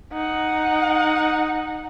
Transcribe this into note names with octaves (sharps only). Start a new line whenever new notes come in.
D#4 F#5